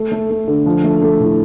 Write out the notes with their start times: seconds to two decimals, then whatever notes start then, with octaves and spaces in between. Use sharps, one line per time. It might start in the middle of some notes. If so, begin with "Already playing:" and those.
Already playing: A3
0.12 A3
0.30 A3
0.48 D3
0.66 F3
0.84 A3
1.02 A3
1.20 A2